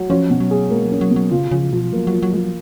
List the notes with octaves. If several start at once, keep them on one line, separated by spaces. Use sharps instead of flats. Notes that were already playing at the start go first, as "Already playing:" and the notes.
Already playing: F#3
F3 C#4
B2
F#3
G#4
G#3 A#3
F#3
C#4
F#3
B2
F#3
C#3 F4
C#3 F3
B2 F3
F#3 A#3
F#3 F4
F#3
F3 F#3 G#3